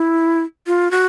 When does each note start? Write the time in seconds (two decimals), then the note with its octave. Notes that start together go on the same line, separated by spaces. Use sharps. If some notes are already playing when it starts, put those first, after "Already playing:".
Already playing: E4
0.67 F4
0.91 F#4